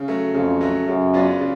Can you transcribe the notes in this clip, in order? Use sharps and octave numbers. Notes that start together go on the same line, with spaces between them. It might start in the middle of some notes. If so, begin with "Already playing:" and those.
Already playing: C#3
F#3 A3
F2 C#3
F#3 A3
F#2 C#3
F#3 B3 D4 F4
C#3